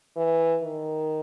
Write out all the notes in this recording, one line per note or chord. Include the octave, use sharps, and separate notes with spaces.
E3
D#3